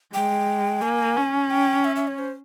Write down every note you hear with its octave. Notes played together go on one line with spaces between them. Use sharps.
G#3 G5
A#3 G#5
C#4
G5
E5
E5
C#5
C5